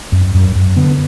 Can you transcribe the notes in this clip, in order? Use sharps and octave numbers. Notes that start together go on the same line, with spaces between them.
F#2
F#2
F#2
D3 B3